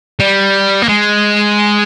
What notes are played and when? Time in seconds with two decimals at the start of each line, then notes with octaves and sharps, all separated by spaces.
0.20 G3
0.82 A#3
0.89 G#3